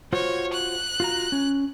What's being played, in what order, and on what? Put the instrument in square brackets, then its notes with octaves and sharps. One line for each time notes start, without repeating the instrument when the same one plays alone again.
[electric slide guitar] F4 F#4 C5 [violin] C#5
[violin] F#6
[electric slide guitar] F4 F#4 A#5
C#4